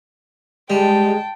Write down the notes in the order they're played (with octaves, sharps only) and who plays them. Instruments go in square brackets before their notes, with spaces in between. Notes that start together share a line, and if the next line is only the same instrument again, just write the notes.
[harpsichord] G3 [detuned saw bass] G#3 [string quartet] G5 A5